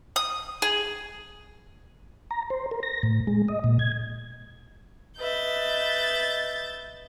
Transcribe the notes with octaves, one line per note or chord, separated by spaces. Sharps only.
D#6
G#4
A#5
C5
A#4
A#6
A2
G#3
D#5
A#2
G#6
B4 D#5 E5 G6 A6